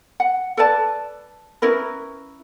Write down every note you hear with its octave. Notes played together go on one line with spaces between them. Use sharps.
F#5
A4 B4 D5 A5
C#4 E4 A#4 B4